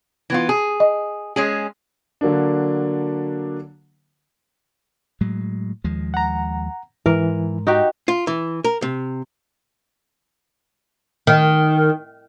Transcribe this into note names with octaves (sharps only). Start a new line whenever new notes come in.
E3 B3 F4
G#4
D#5
G#3 C#4 G#4
D3 F#3 A#3 D4
A2 F#3 G#3
D#2 F3 G#3
F#5 A#5
G#2 E3 A#4
D#4 F#4 G4
F4
E3
A#4
C3
D#3